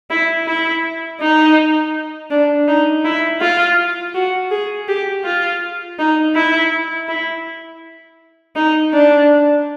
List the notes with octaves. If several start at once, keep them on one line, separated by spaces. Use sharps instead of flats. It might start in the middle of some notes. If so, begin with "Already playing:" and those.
E4
E4
D#4
D4
D#4
E4
F4
F#4
G#4
G4
F4
D#4
E4
E4
D#4
D4